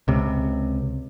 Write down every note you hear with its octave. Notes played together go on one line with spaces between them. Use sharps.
C#2 C3